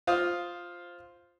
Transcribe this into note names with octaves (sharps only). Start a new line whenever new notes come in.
F4 C5 F5 D#6